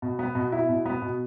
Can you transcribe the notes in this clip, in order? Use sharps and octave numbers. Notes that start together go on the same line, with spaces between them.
B2
B3
B2
E4
B2
B3
B2